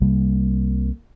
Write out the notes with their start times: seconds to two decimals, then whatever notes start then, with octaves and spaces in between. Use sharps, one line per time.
0.01 C2 C3 G3 A#3